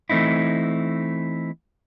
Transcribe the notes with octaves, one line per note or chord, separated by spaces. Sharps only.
E3 A3 C4 D#4 E4